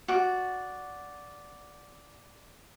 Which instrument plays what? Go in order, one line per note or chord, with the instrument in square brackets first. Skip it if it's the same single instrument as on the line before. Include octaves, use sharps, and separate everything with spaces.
[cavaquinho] F#4 D5